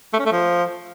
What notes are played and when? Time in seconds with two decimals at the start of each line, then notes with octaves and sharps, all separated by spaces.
0.13 A3
0.19 C#4
0.26 A3
0.32 F3